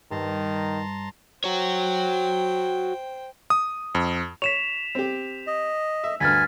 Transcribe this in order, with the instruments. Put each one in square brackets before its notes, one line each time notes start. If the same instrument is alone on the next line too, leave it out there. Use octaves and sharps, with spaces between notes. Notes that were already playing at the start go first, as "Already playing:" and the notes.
[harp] G2 [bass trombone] D#3 [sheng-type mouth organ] A5 A#5 C6
[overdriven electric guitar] F#4 C#5 [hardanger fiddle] C5 G5
[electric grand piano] D#6
F2
[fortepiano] C#5 [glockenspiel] B6 E7 F7
[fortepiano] C4 G4
[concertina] D#5
[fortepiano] E5
[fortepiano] D2 G2 [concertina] G#5 [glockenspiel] F6 A6 B6